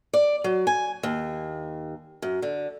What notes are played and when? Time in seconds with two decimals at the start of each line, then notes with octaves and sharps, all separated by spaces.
0.13 D5
0.44 F#3
0.67 G#5
1.03 D#2
2.22 F#2
2.42 D3